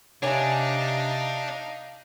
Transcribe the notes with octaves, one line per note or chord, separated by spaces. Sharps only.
C3 D4 D#4 C#5 F5 G#5